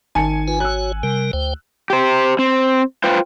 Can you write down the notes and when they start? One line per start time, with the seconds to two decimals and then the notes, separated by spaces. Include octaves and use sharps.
0.15 G#1 D#3 G#5 A5 C#7
0.48 F4 B4
0.60 F#4 C#5 E6 F#6
1.03 C3 G3 A#4
1.33 D2 C5 G5
1.90 G4 C5
2.39 C4
3.04 F4 B4 C5 G5